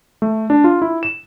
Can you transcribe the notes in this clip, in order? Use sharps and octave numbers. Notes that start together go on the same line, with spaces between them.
A3
D4
F4
E4
E7